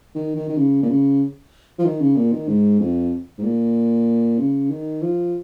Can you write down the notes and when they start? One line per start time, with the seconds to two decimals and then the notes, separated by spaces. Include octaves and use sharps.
0.15 D#3
0.36 D#3
0.49 D#3
0.57 C#3
0.83 A#2
0.89 C#3
1.79 F3
1.85 D#3
2.01 C#3
2.16 A#2
2.32 D#3
2.48 G#2
2.80 F2
3.38 G#2
3.44 A#2
4.39 C#3
4.70 D#3
5.02 F3